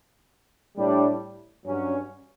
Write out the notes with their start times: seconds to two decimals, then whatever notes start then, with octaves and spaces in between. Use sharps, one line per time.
0.77 A2 G3 D4
1.65 G2 F#3 C#4